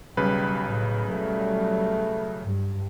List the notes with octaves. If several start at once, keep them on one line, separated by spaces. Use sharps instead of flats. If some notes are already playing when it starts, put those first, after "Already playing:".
B1 C#3 G3 B4
A2
F#3 G3 A3
G2